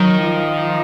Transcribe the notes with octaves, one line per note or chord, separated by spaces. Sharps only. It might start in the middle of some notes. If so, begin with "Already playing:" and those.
Already playing: D#3 F#3
F3